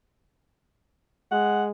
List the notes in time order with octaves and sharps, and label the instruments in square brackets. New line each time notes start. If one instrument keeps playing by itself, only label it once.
[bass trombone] G#3 [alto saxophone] F#5